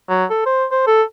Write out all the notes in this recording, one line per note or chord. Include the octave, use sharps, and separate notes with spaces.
F#3
A4
C5
C5
A4